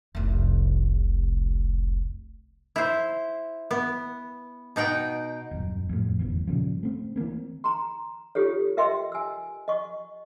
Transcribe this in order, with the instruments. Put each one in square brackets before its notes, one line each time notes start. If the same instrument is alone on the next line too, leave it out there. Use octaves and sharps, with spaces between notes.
[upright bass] F1 C2
[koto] E4 C5
B3
B2 D#4 F#5 G5
[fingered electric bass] D#1 F#2
F2 A2
G1 E2 E3
G2 A#2 C#3 F3
A3 C4
E3 F#3 A#3 C4
[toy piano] A#5 C6
F4 G4 A4 C#5
A#4 D#5 E5 G5 C6
G#5 E6
D#5 C#6